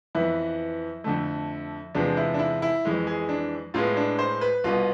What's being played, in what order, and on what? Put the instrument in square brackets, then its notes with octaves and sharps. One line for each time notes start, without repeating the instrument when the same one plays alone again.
[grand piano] F2 E3 B3 E4
F2 D3 A3
E2 C3 F3 G#3 B3 D4
E4
D4
E4
E4
F2 E3 G#3
G#4
D4
A2 G#3 B3 F4
D4
C5
B4
C2 B2 B3 F4